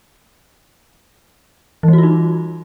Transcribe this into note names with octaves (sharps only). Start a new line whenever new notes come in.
E3 G3 D#4 F4 F#4